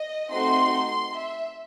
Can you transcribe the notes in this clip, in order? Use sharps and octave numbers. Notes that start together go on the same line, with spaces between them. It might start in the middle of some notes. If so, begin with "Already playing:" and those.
Already playing: D#5
A3 C4 D#4 F#4 C6
C6
E5